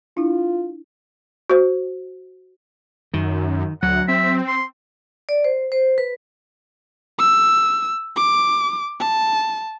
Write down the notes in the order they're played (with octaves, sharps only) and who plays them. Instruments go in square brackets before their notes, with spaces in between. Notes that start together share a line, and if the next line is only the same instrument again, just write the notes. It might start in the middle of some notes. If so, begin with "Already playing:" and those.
[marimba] D4 E4 [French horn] F4
[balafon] F#4 C5
[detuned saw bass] F#2 [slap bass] D#3
[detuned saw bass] D2 [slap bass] F#3 [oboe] F#5
[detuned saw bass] C4 [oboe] E5
[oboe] C6
[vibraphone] D5
C5
C5
B4
[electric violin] E6
D6
A5